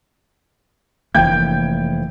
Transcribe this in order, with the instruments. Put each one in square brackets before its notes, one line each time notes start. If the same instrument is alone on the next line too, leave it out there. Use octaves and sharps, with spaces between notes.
[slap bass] F1 E3 A#3 [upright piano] G5 G6 G#6